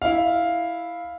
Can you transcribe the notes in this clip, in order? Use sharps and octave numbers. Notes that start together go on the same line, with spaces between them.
E4 F5